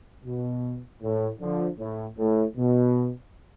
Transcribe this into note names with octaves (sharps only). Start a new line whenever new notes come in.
B2
A2
D3 F3
A2
A2
B2